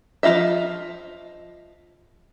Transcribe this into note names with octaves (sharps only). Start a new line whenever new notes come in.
F3 D#4 F4 D#5 E5